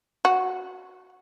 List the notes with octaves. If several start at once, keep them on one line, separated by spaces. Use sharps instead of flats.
F#4